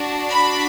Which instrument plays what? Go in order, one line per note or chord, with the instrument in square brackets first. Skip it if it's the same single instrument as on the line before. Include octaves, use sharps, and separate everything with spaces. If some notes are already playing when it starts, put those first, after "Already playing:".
Already playing: [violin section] D4 F#4
B5